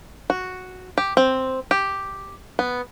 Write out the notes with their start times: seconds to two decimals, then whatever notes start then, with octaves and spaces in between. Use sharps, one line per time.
0.30 F#4
0.98 G4
1.17 C4
1.71 G4
2.59 B3